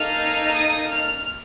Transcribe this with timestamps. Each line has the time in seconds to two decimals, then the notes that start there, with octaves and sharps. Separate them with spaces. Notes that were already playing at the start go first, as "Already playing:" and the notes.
Already playing: A#3 D#4 A4 F6
0.55 D#6
0.91 F6